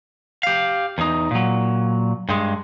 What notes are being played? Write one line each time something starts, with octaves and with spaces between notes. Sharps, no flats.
G4 F5
E2 D#4
A#2 F#3
G2 G#3